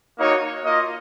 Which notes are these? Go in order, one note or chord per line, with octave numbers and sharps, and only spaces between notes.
A#3 D#4 F#4 C#5
A#3 F4 D#5